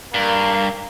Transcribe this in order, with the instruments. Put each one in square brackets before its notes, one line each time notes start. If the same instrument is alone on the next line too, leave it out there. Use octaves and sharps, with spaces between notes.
[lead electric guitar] G2 [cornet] A#3